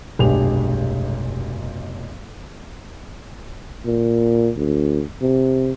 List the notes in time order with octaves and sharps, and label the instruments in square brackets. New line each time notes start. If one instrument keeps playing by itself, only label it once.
[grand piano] F1 B1 G2 G#3 G4 F7
[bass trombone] A#2
D2
C3